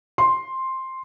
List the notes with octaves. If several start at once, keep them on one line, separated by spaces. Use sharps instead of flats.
C6